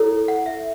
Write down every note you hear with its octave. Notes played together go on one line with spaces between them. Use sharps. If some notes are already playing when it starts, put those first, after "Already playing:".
Already playing: E4 A4 C#5
F#5
E5